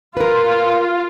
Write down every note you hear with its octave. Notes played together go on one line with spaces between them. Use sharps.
F4 A#4 B4